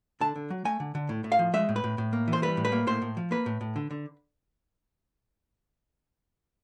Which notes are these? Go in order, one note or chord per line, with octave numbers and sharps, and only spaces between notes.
D3 A5
D3
F#3
A3 G#5
D3
D3
A2
A2
F5
F3
G#3 E5
A2
B4
A2
A2
A#3
E3
C5
G3 B4
A2
B4
A#3
A2 C5
A2
F3
A#3 B4
A2
A2
D3
D3